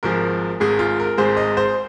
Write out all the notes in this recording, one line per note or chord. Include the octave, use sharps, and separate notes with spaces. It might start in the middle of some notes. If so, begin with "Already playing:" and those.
G#1 G#2 F3 G#3 A#4
G#1 G#2 G#3 G#4
F4
A#4
G#1 G#2 G#3 C5
D#5
C5